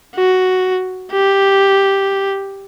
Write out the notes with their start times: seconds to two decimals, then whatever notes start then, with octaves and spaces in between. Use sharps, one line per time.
0.15 F#4
1.12 G4